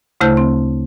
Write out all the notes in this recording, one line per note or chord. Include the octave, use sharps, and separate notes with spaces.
D2 C#3 A3 E4 C5 G6
C4